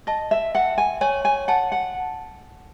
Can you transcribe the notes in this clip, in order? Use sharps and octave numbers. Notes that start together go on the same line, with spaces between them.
D#5 A5
E5
E5 F#5
G#5
C#5 G#5
G#5
F#5 A5
F#5